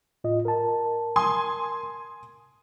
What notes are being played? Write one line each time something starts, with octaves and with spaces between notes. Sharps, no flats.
A2 F4 D#5
A#4 A5
G#5 C6 D#6